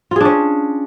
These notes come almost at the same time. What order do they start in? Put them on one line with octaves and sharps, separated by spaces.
F4 G#4 D4 C#4